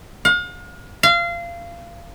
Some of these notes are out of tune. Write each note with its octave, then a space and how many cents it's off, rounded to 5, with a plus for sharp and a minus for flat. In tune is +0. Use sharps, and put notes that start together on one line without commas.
F5 +40
F5 -25